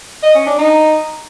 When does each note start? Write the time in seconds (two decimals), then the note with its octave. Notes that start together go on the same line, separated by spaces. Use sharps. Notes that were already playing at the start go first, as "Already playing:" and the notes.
0.23 D#5
0.35 C#4
0.46 D4
0.58 D#4